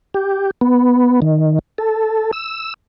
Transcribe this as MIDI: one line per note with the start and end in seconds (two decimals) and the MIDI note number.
0.14 0.51 67
0.61 1.20 59
1.22 1.59 51
1.78 2.31 69
2.33 2.74 88